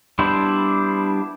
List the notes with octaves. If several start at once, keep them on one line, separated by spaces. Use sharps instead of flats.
G3 B3 D4 E4 C5